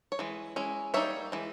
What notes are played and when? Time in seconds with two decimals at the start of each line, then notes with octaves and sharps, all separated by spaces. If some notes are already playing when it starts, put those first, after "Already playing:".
0.12 C#5
0.19 E3 G#3
0.56 G#3 C#4 E4
0.94 G3 A#3 D#4 C#5 E5
1.32 E3 G#3